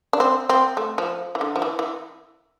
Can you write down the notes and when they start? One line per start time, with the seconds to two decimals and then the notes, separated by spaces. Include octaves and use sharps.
0.13 D4
0.20 C4
0.49 C4
0.77 A3
0.98 F3
1.35 E3
1.41 D3
1.56 F3
1.62 E3
1.79 E3